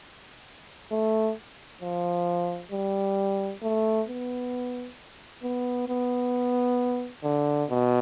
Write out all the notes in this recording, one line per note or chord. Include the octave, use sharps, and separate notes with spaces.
A3
F3
G3
A3
B3
B3
B3
D3
B2